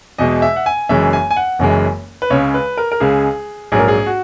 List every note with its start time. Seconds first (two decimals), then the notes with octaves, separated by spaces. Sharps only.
0.18 E2 B2 G#3 D#5
0.42 E5
0.56 F#5
0.66 G#5
0.89 F#1 F#2 E3 G#3 E5
1.13 G#5
1.31 G#5
1.37 F#5
1.59 F#1 F#2 E3 G#3
2.22 B4
2.30 C#2 C#3 G#3 C#5
2.54 B4
2.77 A#4
2.92 A#4
3.00 C#2 C#3 G#3 G#4
3.72 A#1 G#2 F#3 G#4
3.79 A#4
3.88 G#4
4.06 F#4